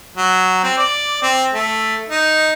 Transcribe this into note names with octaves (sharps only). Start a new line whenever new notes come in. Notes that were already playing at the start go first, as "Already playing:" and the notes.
F#3
C4
D5
C4
A3
D#4